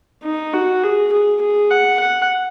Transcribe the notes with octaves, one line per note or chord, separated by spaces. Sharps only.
D#4
F#4
G#4
G#4
G#4
F#5
F#5